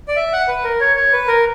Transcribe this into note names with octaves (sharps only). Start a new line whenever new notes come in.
D5
E5
F#5
B4
A#4
C#5
C#5
B4
A#4